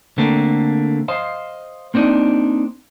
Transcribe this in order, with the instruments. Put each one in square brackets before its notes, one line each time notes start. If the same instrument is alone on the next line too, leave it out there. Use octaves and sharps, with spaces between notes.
[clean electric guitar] D3 A3 A#3 C4
C5 D#5 F5
A#3 C4 D4 D#4